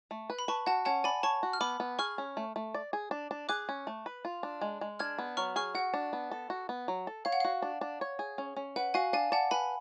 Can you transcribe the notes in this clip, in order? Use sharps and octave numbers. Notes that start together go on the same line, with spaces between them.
A3
B4
B5
B4 A5 C#6
F#4 F#5 A5
C#4 F#5 A5
D5 G#5 B5
C#5 A5 C#6
F#4
F6
B3 B5 D6
B3
G#4 C#6 F6
C#4
A3
A3
D5
G#4
D4
D4
G#4 D6 F#6
C#4
A3
B4
F4
D4
G#3
G#3
D4 F6 G#6
B3
F#3 C#6 F6
G#4 C#6 F6
F#4 F#5
D4
B3
A4
F#4
B3
F#3
A4
C#5 F5
F#5
F#4 F5
D4
D4
C#5
G#4
C#4
C#4
B4 F#5
F#4 F5 G#5
D4 F5 G#5
D5 F#5 A5
B4 G#5 B5